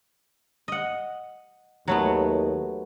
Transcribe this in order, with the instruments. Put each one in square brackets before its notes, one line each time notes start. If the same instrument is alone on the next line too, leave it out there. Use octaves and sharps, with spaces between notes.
[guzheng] D#5 F#5
[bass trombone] D#2 [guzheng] F#3 A3 B3